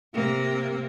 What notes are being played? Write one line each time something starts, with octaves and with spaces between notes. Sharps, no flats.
C3 A#3